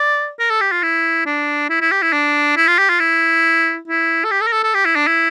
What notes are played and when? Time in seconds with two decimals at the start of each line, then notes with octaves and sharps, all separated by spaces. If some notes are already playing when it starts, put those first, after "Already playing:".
Already playing: D5
0.39 A#4
0.50 A4
0.61 G4
0.72 F4
0.83 E4
1.26 D4
1.70 E4
1.81 E4
1.91 G4
2.02 E4
2.13 D4
2.57 E4
2.68 F4
2.79 G4
2.90 F4
3.00 E4
3.88 E4
4.25 A4
4.31 G4
4.41 A4
4.47 A#4
4.53 A4
4.63 A4
4.74 G4
4.85 E4
4.96 D4
5.07 E4